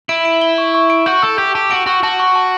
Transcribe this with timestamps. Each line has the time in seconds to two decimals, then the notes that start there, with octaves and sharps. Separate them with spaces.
0.09 E4 D7
0.25 D7
0.41 G7
0.58 C#6
0.74 C#6
0.90 D7
1.06 F#4 G6
1.22 A4 E6
1.38 G4 G6
1.55 G4 A5
1.71 F#4 D7
1.86 F#4 C#6
2.03 F#4 A5
2.20 C#6
2.36 A5